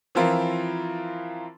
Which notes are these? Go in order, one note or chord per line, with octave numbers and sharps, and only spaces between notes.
E3 F3 C4 E4 F4 A#4